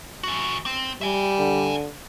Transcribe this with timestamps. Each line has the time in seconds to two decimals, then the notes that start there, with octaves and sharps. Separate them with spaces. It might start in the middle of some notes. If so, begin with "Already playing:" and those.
0.24 E3 F#4
0.66 C4
1.01 G3 E5 G#5
1.39 D3